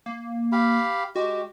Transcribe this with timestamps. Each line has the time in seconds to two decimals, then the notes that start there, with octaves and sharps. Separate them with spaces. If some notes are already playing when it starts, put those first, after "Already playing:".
0.06 A#3
0.52 G4 F5 B5
1.16 G#3 F#4 G4